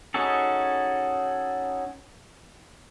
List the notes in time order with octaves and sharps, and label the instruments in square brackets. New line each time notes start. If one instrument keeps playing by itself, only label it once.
[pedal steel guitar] C#4 D#4 F#4 G#4 A4